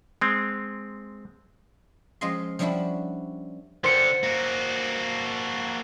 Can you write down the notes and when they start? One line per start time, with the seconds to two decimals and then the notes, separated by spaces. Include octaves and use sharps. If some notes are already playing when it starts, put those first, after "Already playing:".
0.21 G#3 C4
2.21 F3 G#3 C#4 F4 D#5 C6
2.59 F3 G3 C#4 D4 E4 F#4
3.84 D3 G4 C5 C#7
4.23 A#3 F#4